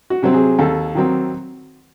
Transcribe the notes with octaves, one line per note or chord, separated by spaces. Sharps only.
F#4
C3 F#3 C4
G#4
D#2 A4
D#3 F#3 C4